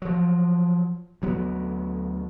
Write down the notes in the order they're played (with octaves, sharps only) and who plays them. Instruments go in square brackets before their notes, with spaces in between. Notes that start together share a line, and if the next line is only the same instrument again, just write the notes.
[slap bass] F3 F#3
D2 F#3 B3